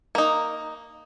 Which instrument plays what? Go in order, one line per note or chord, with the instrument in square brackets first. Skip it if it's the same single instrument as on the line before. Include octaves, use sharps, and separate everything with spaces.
[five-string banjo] A#3 D#4